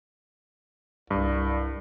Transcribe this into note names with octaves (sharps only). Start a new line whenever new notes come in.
C2 G2